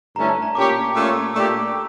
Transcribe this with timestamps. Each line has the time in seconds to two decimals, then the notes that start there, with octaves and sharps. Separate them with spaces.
0.16 G2 D3 A3 C#4 E4 A#5
0.29 A5
0.42 A#5
0.55 A#2 A3 C#4 G4 C#5 D6
0.95 A#2 A3 C#4 F4 C#5
1.34 A#2 A3 D4 G4 E6